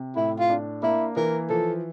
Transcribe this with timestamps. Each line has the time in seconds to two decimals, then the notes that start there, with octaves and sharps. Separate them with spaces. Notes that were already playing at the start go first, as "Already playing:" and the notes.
Already playing: C3
0.16 A2 E4
0.39 F4
0.50 D4
0.83 A#3 E4
1.16 E3 A#4
1.50 F3 A4